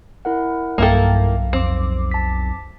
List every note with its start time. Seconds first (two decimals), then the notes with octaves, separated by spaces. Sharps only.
0.25 E4 A#4 F#5
0.78 B1 G2 A#3 E4 A4 A#4 F5 G5
1.53 F2 C4 D6
2.11 A5 B6